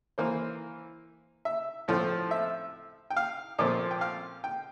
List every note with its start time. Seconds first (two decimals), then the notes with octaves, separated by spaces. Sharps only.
0.18 E3 A#3 C5
1.45 E5
1.88 A2 F3 A3 C4
2.31 E5
3.10 G5
3.17 F5
3.59 A#2 F3 A3 C4
3.91 G5
4.01 F5
4.44 G5